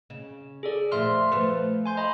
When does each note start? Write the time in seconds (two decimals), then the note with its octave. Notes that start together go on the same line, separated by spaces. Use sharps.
0.10 C#3
0.63 G#4 A4 D5
0.92 D2 A#2 F3 E5 C6 F6
1.32 F3 A3 B4
1.86 G#5 C6 G6
1.97 D#5 A#5 B5